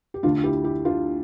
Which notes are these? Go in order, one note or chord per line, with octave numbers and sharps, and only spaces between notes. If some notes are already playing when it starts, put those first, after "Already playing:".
G4
D2 D3 D4 F4
E4 G4
E4 G4
D4 F4